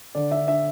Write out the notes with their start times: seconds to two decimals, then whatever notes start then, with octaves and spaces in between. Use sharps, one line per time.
0.15 D3 D5
0.31 D4 E5
0.48 D4 E5